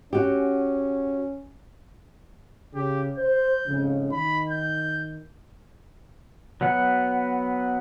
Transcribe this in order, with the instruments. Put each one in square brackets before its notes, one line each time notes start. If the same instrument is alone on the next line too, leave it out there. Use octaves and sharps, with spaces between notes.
[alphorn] C#4 [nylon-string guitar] F#4 G4
[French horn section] C#3 [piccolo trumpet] G4
[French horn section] C5 [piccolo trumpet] G6
[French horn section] F2 G#2 C#3
[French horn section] D#3 [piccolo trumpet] B5
[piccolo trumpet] G6
[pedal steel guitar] F#3 B3 F#5